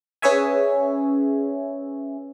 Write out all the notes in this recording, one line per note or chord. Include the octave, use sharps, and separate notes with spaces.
C#4 G#4 B4 C#5 E5 G#5